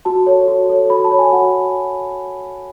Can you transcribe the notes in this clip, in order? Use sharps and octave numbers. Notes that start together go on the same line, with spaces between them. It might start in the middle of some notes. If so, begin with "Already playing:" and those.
F#4 A5
A4 C#5
F#4
A4 C#5
F#4 B5
A5
C#5
G#5
F#4 F#5